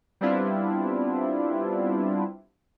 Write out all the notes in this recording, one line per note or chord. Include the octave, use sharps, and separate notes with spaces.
G3 B3 C4 D4 E4 F4